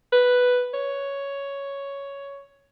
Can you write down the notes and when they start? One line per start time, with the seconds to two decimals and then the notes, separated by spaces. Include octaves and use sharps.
0.12 B4
0.74 C#5